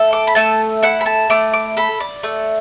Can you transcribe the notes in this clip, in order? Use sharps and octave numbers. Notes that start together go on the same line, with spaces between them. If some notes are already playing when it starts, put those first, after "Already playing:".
Already playing: A3 A4
D6
B5
A3 A5
E4 F#5
B5
A5
A3 D6
D6
A4 B5
D5
A3